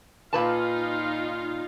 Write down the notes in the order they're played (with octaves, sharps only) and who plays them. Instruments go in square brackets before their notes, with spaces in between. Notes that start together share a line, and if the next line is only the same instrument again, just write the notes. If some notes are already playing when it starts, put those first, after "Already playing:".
[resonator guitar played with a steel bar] A#2 B4 A5 [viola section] D#4 F4 F5